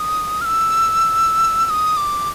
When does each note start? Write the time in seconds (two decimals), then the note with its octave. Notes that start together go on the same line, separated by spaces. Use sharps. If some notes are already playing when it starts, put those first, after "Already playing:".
Already playing: D#6
0.41 F6
0.45 E6
1.66 E6
1.70 D#6
1.97 D6